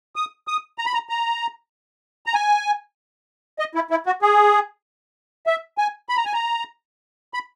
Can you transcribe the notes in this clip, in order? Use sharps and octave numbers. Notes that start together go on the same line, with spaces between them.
D#6
D#6
A#5
B5
A#5
A#5
A#5
G#5
D#5
E4
E4
F#4
G#4
E5
G#5
B5
A#5
G#5
A#5
B5